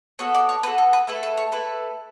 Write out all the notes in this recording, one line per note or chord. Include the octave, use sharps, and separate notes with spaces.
B3 F#4 A4 C#5
D5
C#5
B3 F#4 A4 B4
A4
B4
A3 E4 A4 B4
B4
C#5
A3 E4 A4 B4